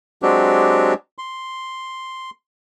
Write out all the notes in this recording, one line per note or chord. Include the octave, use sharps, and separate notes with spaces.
F#3 G#3 C4 D4 F#4 G4
C6